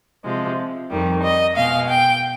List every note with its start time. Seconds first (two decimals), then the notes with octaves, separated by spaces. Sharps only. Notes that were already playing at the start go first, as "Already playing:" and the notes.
0.24 C3 F3 G#3
0.90 F2 D#3 G3
1.23 D#5
1.56 B2 G#3 F5
1.90 G5